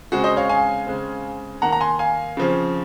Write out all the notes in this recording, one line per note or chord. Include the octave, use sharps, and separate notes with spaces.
C#3 G#3 C4 F#4
C5 D#5
C#5 F5
F5 G#5
C#3 G#3 C4
D#3 A#3 F#5 A#5
A#5
G#5 C6
F5 G#5
C#3 F3 C4